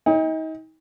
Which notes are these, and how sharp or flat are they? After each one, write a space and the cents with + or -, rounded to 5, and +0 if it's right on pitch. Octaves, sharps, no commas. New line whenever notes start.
D#4 +35 G5 +40